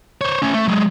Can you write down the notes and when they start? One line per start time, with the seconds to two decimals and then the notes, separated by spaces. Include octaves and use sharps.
0.21 C5 C#5
0.42 A3 C#4
0.54 A3
0.68 F#3 G#3